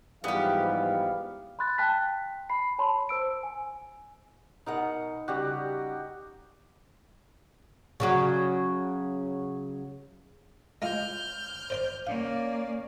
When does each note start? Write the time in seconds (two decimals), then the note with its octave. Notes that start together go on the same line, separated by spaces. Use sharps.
0.24 G#2 E3 F3 G3 B3 G4 F5
1.59 B5 C6 F#6 A6
1.78 G5 A5 F#6 B6
2.50 B5 C7
2.79 C#5 A5 B5 C6
3.09 C5 E6 D7
3.43 G#5
4.66 B2 D#4 A#4 F#5
5.28 C#3 G3 F#4 G4 F#5
8.00 C#3 F#3 F#4
10.82 G#3 F4 F6 G6
11.70 C5 D5 C6
12.07 A#3 C#4 D5 F5